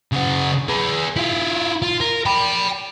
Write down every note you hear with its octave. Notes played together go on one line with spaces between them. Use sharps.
C#3 F#4
G#4 B4
E4 F4
F4
A#4
G5 B5